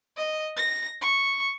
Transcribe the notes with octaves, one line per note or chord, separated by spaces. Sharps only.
D#5
A#6
C#6